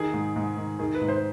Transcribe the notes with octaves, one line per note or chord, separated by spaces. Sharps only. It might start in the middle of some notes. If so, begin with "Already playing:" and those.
Already playing: D#3 G#4
G#2
G#2
D#3
D#3 G#4
B4
G#2
C5